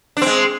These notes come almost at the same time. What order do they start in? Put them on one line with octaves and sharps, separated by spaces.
D4 C4 G#3